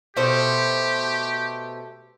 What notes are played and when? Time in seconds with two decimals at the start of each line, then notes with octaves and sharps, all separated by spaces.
0.17 B2 A3 G4 C5